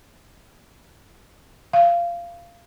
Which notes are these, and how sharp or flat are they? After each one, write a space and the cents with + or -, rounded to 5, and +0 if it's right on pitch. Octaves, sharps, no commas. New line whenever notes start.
F5 -20